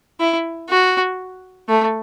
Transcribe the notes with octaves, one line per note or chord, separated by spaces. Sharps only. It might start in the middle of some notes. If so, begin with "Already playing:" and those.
E4
F#4
A3